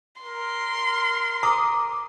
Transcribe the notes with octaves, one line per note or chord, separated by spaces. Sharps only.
A#4 C6
A#5 D6 D#6